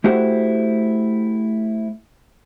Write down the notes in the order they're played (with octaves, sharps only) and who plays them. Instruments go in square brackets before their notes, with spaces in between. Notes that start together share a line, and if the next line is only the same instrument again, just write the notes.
[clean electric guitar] A3 E4 F#4 G4 C5 F#5